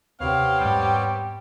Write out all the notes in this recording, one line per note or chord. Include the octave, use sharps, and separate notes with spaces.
D#2 C3 B3 C4 G4 C#5 F5
E2 G#2 G3